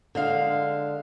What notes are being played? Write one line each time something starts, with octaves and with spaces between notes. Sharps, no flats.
D3 G#3 F5